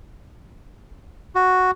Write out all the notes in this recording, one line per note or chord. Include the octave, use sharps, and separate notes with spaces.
F#4